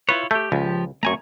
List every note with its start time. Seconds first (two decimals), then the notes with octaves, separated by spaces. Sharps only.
0.09 E4 F4 B4 C#5
0.31 A3 G4 G6
0.52 C#2 F3 G4
1.03 F#2 A3 C4 G#5 A#5 C#6